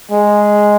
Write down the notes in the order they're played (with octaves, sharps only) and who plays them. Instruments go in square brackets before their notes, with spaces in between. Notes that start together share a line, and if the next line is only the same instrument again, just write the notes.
[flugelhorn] G#3